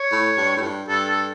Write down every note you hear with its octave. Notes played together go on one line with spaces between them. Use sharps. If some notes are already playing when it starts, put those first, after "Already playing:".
Already playing: C#5
A2
G2
A2
G2
G2 A4
A4